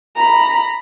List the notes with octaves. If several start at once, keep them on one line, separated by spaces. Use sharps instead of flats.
A#5 B5